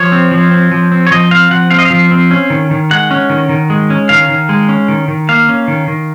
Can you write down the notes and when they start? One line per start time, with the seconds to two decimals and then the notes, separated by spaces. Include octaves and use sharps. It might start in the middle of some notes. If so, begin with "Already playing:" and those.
Already playing: F3 C#5
0.12 C4
0.32 F3
0.51 C4
0.71 F3
0.92 C4
1.07 C#5
1.11 F3 D#5
1.31 C4 F5
1.51 F3 F#5
1.71 C4 F5
1.79 D#5
1.85 F5
1.90 F3
2.11 C4
2.31 C#4
2.50 D#3
2.71 D#3
2.91 G#3 F#5
3.11 C#4
3.30 D#3
3.49 D#3
3.70 G#3
3.90 C#4
4.09 D#3 F5
4.29 D#3
4.49 G#3
4.69 C#4
4.88 D#3
5.08 D#3
5.29 A#3 F5
5.49 C#4
5.68 D#3
5.88 D#3